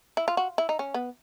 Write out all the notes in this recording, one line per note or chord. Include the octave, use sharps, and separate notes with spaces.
E4
F4
F#4
E4
D#4
C#4
B3